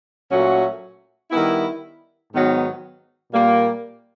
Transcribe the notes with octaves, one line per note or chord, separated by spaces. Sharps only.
A#2 F#3 A3 C#4 F#4
D#3 G3 B3 E4
G#2 D#3 F#3 B3
A#2 G3 A#3